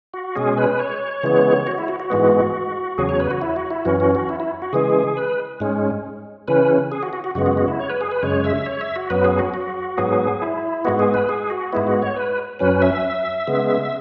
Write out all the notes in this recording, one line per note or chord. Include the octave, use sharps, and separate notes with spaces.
F#4
B2 G#3 C#4 G#4
B4
C#5
C#3 E3 G#3 B3
F#4
E4
F#4
F#4
G#2 E3 G#3 B3
E2 C#3 F#3 G#4
C#5
B4
F#4
E4
F#4
E4
F#2 E3 C#4 F#4
F#4
F#4
E4
E4
F#4
C#3 E3 G#3 G#4
B4
G#2 G#3 C#4
C#3 E3 C#4 B4
G#4
F#4
F#4
F#4
F#2 C#3 G#3 B3 F#4
F#4
F#4
E4
C#5
B4
G#4
B4
F#2 C#3 G#3 C#5
E5
C#5
E5
F#4
F#2 F#3 B3 B4
G#4
F#4
F#4
G#2 F#3 B3 G#4
E4
G#2 G#3 B3 F#4
G#4
B4
G#4
F#4
G#2 G#3 B3 E4
F#4
C#5
B4
F#2 F#3 C#4 B4
E5
C#3 G#3 B3